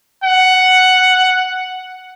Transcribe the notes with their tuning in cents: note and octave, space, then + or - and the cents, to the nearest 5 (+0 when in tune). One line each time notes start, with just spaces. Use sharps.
F#5 +5